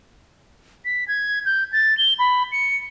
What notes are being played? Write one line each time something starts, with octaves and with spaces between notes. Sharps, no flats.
B6
G#6
G6
A6
G7
B5
C#7